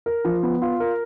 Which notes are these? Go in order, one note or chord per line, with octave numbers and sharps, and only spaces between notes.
A#4
F3
B3
F4
A#4